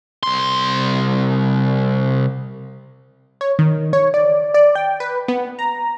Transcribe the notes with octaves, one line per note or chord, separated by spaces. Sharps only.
C2 C6
C#5
D#3
C#5
D5
D5
G5
B4
B3
A#5